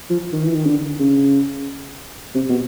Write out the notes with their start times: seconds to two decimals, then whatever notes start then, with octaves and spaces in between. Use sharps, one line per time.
0.10 F3
0.33 D#3
0.44 E3
0.56 D#3
0.66 D3
1.00 C#3
2.35 C3
2.49 B2